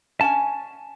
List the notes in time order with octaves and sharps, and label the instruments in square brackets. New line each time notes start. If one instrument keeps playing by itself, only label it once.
[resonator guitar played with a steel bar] C#4 F#5 G#5 [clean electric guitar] A5